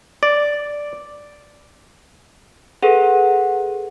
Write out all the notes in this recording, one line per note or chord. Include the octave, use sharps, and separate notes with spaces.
D5
G#4 A4 B4 F#5